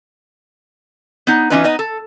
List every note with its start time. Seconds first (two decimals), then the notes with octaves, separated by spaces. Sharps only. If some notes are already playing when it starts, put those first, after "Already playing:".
1.27 B3 D#4
1.50 E3 C4 C#4 D#4 F4 B4
1.64 B3 D#4 D#5
1.79 A4